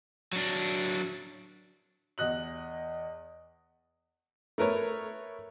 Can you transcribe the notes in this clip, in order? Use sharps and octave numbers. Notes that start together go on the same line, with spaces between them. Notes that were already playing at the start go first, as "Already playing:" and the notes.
F#3 D4
E2 D#5 F#6 F#7
A3 A#4 B4 C#5